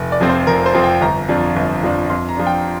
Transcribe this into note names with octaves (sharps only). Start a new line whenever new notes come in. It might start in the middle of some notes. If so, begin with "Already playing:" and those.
Already playing: F1
D5
F2 F3 C4
C5
F1 A#4
C5
F2 F3 C4
G5
G1 A#5
F2 F3 D4
G1
F2 F3 D4
F2 C6
A#5
F3 D4
G5